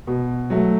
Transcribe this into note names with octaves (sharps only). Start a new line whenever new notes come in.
B2
F#3 A3